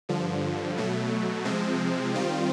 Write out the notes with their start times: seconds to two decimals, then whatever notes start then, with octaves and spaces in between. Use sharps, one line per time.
0.09 G2 D3 F3
0.78 B2 F#3 A3
1.45 C3 F3 G#3 C4
2.14 D#3 G3 C4 F4